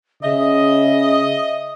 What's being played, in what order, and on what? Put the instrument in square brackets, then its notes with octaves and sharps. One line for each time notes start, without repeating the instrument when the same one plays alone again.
[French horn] C#3 [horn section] D#5 [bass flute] E5